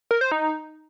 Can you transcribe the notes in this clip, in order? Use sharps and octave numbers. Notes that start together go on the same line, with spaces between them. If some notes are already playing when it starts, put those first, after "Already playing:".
A#4
C5
D#4